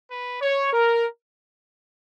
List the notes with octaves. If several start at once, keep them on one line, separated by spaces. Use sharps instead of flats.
B4
C#5
A#4